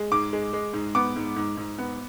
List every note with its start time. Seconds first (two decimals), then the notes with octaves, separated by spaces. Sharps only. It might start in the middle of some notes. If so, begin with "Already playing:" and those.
Already playing: G#3
0.12 G#2 D6
0.33 G#3
0.53 G#3
0.73 G#2
0.95 B3 D6
1.16 G#2
1.36 G#2
1.57 G#2
1.78 B3